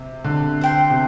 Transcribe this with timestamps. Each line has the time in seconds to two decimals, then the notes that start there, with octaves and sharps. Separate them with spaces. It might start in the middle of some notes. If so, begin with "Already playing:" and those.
Already playing: C3
0.24 D3
0.61 C5 G5 C6
0.90 C3